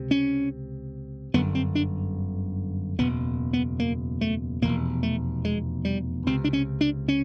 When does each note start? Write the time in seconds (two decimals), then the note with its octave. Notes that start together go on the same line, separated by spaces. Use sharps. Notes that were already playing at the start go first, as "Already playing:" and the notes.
Already playing: C#2 C3
0.11 C#4
1.34 G1 F#2 D3 B3
1.55 C4
1.75 D4
2.99 F#1 E2 B2 B3
3.53 B3
3.80 A#3
4.21 A3
4.62 F1 E2 B2 A#3
5.03 A3
5.45 G#3
5.85 G3
6.27 C#2 C3 C4
6.44 D4
6.53 C#4
6.81 D4
7.08 C#4